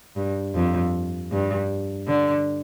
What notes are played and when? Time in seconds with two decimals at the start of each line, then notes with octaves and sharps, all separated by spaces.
0.16 G2
0.55 F2
1.32 G2
2.08 D3